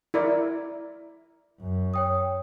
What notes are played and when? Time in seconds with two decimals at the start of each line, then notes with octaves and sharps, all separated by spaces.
0.14 E4 A#4 D5
1.60 F#2
1.94 C#5 G5 D#6